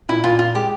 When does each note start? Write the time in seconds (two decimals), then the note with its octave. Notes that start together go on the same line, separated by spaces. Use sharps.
0.09 A#2 E4
0.24 A#2 F4
0.39 A#2 F4
0.55 G#3 G4